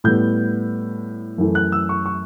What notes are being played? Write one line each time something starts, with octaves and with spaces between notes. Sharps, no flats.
A2 G3 B3 G6
F#2 E3 A3
F#6
E6
C#6
C#6